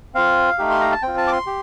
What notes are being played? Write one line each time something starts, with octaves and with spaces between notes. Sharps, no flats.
C4 F4 F5
A3 D#4 G4
C6
A#5
A5
C4 F4 G5
A5
D6
C6
G4